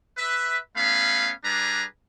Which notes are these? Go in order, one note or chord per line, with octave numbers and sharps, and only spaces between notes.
B4 E5
A3 B3 C#4 F5 B5
G3 D4 G#4 B4 A#5